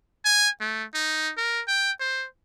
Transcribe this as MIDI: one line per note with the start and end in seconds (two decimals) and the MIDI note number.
0.25 0.49 80
0.61 0.84 57
0.94 1.32 63
1.37 1.62 70
1.68 1.92 79
2.00 2.26 72